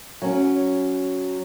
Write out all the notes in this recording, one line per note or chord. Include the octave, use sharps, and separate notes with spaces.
F#3 C#4